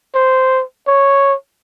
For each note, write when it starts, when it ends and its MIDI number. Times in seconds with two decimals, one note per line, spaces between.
0.15 0.63 72
0.88 1.34 73